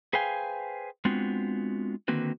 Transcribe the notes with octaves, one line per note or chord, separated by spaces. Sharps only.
G#4 B4 C5 F5 G5 G#5
G#3 B3 C4 D4 F4 F#4
D3 D#3 A#3 C4 F#4 B4